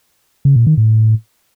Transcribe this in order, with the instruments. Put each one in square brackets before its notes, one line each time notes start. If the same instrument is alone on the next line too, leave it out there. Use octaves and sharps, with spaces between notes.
[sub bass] C#3
A#2
D#3
A2